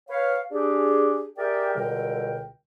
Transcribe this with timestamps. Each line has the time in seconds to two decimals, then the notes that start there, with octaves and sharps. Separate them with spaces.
0.10 B4 C#5 F5
0.52 D4 G4 G#4
1.38 G4 G#4 A#4 D5 E5 G5
1.75 C#2 B2 D3 G3 A#4 G5